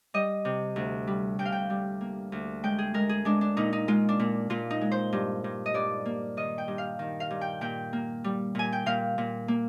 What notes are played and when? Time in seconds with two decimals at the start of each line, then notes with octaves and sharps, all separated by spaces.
0.14 G3 D#5
0.45 C3
0.76 D2
1.07 G3
1.39 D2 G5
1.45 F5
1.52 G5
1.70 G3
2.01 A#3
2.32 D2
2.64 G#3 G5
2.79 G#4
2.94 G#3 A#4
3.09 G#4
3.25 G#3 D4
3.41 D4
3.57 A#2 D#4
3.73 D#4
3.88 G#3 F4
4.09 D4
4.19 A#2
4.50 A#2 F4
4.71 D#4
4.81 G#3
4.92 C5
5.13 G2
5.44 G2
5.66 D#5
5.74 G2 D5
6.06 A#3
6.37 D#3 D#5
6.58 G5
6.68 G2
6.78 F5
6.99 D#3
7.20 F5
7.30 G2
7.41 G5
7.61 A#2 G5
7.93 A#3
8.24 G3
8.55 A#2 G#5
8.73 G5
8.86 A#2 F5
9.18 A#2
9.48 A#3